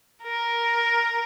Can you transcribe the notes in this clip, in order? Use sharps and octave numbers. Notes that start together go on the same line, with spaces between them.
A#4